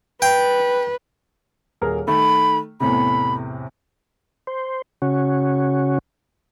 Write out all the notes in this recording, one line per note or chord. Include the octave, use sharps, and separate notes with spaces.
B4 G5
D#1 G#4 A#4
D#3 A3 B5
E2 A2 C3 B5
C5
C#3 C#4 F#4